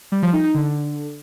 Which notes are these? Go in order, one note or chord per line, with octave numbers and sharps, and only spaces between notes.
G3
F3
D#4
D#4
D3